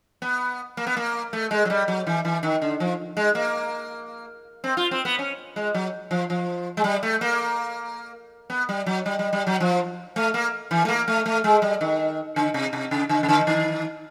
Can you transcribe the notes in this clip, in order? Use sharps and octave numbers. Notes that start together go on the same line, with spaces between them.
B3
A#3
B3
A#3
A3
G#3
F#3
G3
F#3
E3
E3
D#3
D3
F3
G#3
A#3
C4
F4
C4
B3
C#4
G#3
F#3
F3
F3
G#3
G3
A3
A#3
B3
G3
F#3
G3
G3
G3
F#3
F3
A3
A#3
E3
A3
A#3
A3
A3
G#3
G3
D#3
D3
C3
C3
C#3
D3
C#3
D3
D#3